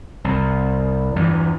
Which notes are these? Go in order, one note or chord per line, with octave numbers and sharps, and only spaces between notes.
C2
E2 G2 E3